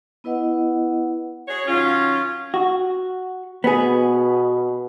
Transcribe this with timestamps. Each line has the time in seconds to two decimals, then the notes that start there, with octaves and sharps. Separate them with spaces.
0.24 B3 E4 B4 D#5 F#5
1.48 F#4 G#4 C#5
1.67 D#3 F#3 C#4 F4
2.54 F#4
3.64 B2 B3 G#4